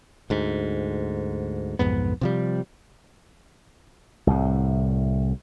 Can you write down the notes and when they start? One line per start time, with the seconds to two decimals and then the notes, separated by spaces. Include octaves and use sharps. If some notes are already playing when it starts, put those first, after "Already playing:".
0.30 D2 G#2
1.79 B1 F2 G#2 B3
2.21 C3 F3 G3
4.27 C2 A2